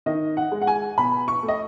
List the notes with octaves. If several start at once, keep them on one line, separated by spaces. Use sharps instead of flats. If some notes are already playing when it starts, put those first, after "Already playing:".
D#3 D#5
F#5
G#3
F#5
G#5
B2 B5
C#6
A3
D#5